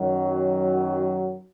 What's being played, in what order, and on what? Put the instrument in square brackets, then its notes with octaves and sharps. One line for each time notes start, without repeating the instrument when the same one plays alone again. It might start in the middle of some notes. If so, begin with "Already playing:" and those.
Already playing: [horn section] F#2 D#3 F#3